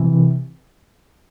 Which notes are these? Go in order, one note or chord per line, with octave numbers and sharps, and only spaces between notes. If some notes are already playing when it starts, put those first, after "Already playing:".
Already playing: C3 E3